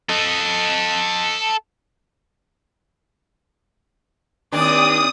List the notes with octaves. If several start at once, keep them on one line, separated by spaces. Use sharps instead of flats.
A4 D#5
D#2 C4 D4 D5 D#6